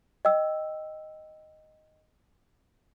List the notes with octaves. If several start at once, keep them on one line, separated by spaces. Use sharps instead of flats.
D#5 G5 E6